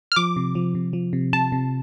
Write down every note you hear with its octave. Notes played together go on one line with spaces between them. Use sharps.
F6
F3 D6
C3
F3
C3
F3
C3
C3 A5
C3